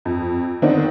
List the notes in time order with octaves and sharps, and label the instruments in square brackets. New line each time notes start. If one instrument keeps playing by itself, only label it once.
[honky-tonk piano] F2
D3 D#3 B3 C4 D4 D#4